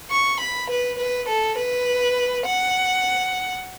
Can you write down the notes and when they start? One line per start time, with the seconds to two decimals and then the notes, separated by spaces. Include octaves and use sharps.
0.11 C#6
0.40 B5
0.70 B4
0.99 B4
1.29 A4
1.58 B4
2.46 F#5